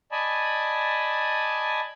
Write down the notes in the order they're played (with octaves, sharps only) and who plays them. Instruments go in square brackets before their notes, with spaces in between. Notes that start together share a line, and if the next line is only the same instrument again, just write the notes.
[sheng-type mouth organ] D5 D#5 G#5 A5 B5